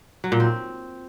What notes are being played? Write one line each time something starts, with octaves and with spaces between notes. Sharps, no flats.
F#3
A#2
C4